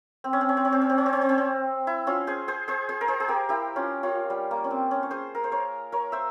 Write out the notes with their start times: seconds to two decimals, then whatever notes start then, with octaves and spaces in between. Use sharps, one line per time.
0.24 C4
0.33 C#4
0.41 C4
0.49 C#4
0.57 C4
0.65 C#4
0.72 C4
0.81 C#4
0.90 C4
0.98 C#4
1.06 C4
1.13 C#4
1.21 C4
1.29 C#4
1.38 C4
1.87 E4
2.07 C#4 F4
2.27 G#4 C5
2.48 G#4 C5
2.68 G#4 C5
2.89 G#4 C5
3.01 A#4
3.08 G#4 C5
3.20 G#4
3.28 G4 A#4
3.49 E4 G4
3.76 C#4 F4
4.03 C#4 F4
4.30 G3
4.51 A#3
4.64 C#4
4.70 C4
4.91 C#4
5.03 C#5
5.11 G#4 C5
5.35 A#4
5.44 C5
5.52 A#4 C#5
5.92 A#4 C#5
6.12 C5 E5